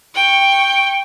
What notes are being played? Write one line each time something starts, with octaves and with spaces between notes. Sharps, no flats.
G5 C#6